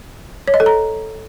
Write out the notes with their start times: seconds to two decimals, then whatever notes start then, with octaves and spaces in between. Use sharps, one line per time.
0.48 C#5
0.54 D#5
0.60 A4
0.66 A#5